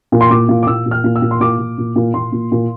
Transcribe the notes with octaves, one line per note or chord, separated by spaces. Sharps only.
A#2
C6
A#2 D6
A#2
D6
A#2 E6
A#2
F6
A#2
E6
A#2
C6
A#2 D6
A#2
A#2
A#2
A#2 C6
A#2
A#2